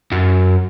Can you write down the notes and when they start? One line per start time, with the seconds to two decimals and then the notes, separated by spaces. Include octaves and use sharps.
0.12 F#2